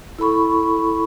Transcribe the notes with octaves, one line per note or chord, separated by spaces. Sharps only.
E4 A4 B5 C#6